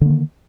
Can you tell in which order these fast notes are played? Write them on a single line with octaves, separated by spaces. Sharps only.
D3 A#3 D#3